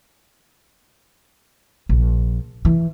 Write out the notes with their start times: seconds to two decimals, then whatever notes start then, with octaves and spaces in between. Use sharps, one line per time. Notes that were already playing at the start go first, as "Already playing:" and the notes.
1.89 A#1
2.65 E3